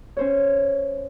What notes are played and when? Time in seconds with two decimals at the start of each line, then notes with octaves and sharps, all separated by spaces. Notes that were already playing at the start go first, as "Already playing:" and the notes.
0.17 C#4 C5 C#5